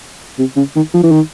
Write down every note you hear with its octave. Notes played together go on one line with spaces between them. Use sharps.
C3
C#3
D#3
F3
E3
D#3